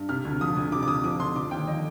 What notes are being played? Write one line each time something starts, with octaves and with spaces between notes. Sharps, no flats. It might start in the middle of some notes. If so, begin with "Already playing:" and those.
Already playing: G2
C3 F6
D2
F3 D#6
D2
C3 D6
D6
D2 D#6
F3 D6
D2 C6
D3 D6
D#2 G5
F3 D#5